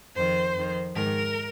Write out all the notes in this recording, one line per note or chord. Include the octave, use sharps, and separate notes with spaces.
F2 D#3 C5
F2 D#3
G#2 D#3 A#4